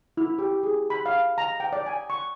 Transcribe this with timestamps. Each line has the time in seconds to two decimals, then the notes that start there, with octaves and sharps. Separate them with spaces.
0.17 E4
0.39 G4
0.63 G#4
0.90 B5
1.06 F5
1.38 A#5
1.60 G5
1.73 D5
1.86 G#5
2.10 C#6